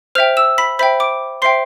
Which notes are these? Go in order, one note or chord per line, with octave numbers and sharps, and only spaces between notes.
C5 E5 G5 F6 F7
E6 E7
B5 B6
C5 E5 G5 B5 B6
D6 D7
C5 E5 G5 C6 C7